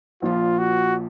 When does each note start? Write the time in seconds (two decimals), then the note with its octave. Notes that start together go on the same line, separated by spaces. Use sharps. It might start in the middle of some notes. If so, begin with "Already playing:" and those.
0.22 A#1 A#2 F3 F4
0.59 F#4